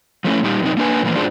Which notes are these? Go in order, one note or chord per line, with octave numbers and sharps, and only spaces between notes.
F3 A3 C#4 E4
A#2 G3 D#4 G4
F#2 C3 D#4
A#3 D4 B4 G#5
A#2 E3 F3 A#3
G#2 D4 F4 G#4 C5